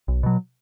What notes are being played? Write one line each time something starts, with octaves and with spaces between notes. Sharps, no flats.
B1
B2 F#3